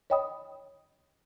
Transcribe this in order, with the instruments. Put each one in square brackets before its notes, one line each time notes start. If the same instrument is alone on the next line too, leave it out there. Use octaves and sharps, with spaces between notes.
[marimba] C#5 D#5 G5 B5 D#6